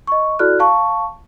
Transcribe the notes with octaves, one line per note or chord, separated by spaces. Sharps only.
D#5 C#6
E4 F#4 A4 D5 F6 F#6
F5 A5 C#6